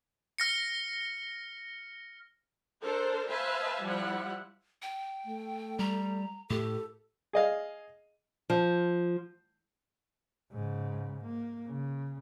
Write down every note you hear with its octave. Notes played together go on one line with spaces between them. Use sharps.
F6 A#6 C#7
D4 A4 A#4 C5
B4 C5 E5 F5 G#5 A5
F3 G3 E4 F#5
G5
A3
G3 A#5
A2 G4 A4
G#4 D#5 F5
F3
G#2 C#3
A#3
C#3